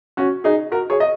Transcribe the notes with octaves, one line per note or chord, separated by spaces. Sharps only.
C#4 F#4
D#4 G#4
F#4 A#4
G#4 C#5
D#5